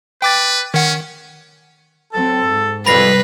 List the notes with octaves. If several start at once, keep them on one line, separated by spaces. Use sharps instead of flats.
B4 G5 D6 A6
D#3 C#4 F#5
F#3 C4 A4
G#2
C2 F2 G3 B4 B5 A#6 C7